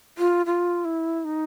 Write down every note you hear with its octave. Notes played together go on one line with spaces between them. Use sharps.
F4
F4
E4
D#4